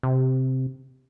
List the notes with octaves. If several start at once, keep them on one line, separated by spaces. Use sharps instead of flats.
C3